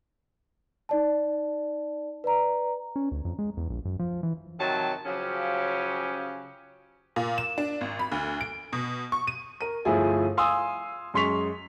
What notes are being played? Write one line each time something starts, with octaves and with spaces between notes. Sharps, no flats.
D#4 D5 A5
B4 D5 A#5
C#4
D2
F2
G#3
E2
A#1
F#2
F3
E3
C3 D#3 F#3 A5
C#3 F3 F#3 C#4 G4
A#2
E7
D4
G#1
B5
D2
D7
B2
C#6
D#7
A#4 D#7
G1 F3 A3 E4 G#4 G#5
F5 G#5 C6 D#6 E6
F#2 G#3 C6 C#6 B6 F7